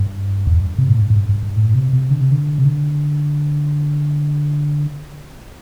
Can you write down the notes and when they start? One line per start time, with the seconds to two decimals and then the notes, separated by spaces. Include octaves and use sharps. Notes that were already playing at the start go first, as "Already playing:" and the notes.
Already playing: G2
0.47 E2
0.61 G2
0.78 C3
0.88 A2
1.02 G2
1.10 A2
1.16 G2
1.29 G2
1.43 G2
1.56 A2
1.75 C3
1.93 C3
2.10 D3
2.21 C3
2.32 D3
2.58 C3
2.65 D3